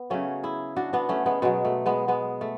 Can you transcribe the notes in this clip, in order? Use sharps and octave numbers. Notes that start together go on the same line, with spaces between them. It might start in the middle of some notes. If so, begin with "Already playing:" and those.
Already playing: B3
C#3 F#3 A3 C#4
E4 G#4
D4 F#4
B3 D4
A3 C#4
G#3 B3
B2 F#3 G#3
A3
G#3 B3
G#3 B3
A3